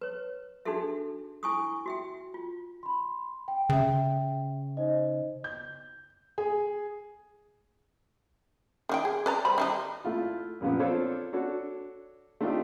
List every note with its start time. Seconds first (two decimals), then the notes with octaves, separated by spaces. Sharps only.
0.01 B4 C#5
0.65 D4 D#4 F#4 G#4 A4 E5
1.43 E4 G#5 C#6 D#6
1.86 F#4 E5 G5
2.34 F4
2.83 B5 C6
3.48 G5
3.69 C#3 E5 G5
4.77 D#4 C5 D#5
5.44 G6
6.38 G#4
8.89 D#3 F#4 G5
9.05 G#4
9.26 B4 D5 A#5
9.45 G3 C5 B5
9.58 D#3 G3 D#4
10.04 A3 E4 F4
10.61 F#2 A#2 F3 B3
10.79 C4 D4 F4 A4 C5 C#5
11.33 D4 F#4 A4 C#5
12.41 A3 C4 D4 D#4 F4 G4